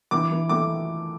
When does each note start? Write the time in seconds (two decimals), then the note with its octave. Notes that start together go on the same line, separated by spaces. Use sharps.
0.11 E3 D6
0.31 E3
0.49 A3 D6